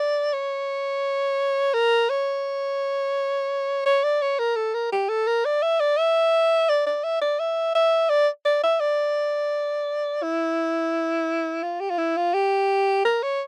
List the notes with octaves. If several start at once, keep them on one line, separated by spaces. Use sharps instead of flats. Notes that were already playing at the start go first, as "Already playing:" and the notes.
Already playing: D5
C#5
A#4
C#5
C#5
D5
C#5
A#4
A4
A#4
G4
A4
A#4
D5
E5
D5
E5
D5
D5
E5
D5
E5
E5
D5
D5
E5
D5
E4
F4
G4
F4
E4
F4
G4
A#4
C#5